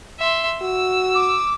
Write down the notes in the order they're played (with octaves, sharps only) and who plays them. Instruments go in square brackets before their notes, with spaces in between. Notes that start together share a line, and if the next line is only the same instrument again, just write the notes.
[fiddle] E5 C6
[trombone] F#4 [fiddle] E6
[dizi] D6